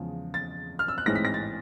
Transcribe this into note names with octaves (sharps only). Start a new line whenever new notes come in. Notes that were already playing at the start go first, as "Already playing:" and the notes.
Already playing: E2 C#3 F3 G#3
A6
F6
E6
F#6
A1 G#2 E3 G#3 C4 A#6
B6
A#6
A6